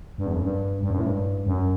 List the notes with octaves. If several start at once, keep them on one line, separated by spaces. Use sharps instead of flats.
G2
E2
F#2
G2
G2
F#2
A2
G2
F#2